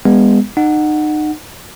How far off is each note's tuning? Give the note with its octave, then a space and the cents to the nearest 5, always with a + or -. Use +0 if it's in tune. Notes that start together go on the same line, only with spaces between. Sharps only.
G#3 -35 B3 +0
D#4 -35 F#5 +0